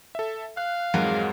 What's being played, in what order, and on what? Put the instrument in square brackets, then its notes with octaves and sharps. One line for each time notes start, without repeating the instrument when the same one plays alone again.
[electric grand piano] A4 E5
[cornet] F5 [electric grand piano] F#6
[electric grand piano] F2 G#2 F#5 [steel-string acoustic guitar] F#3 G#3 A#4